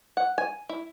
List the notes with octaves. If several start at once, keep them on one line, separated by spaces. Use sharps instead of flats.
F#5
G#5
E4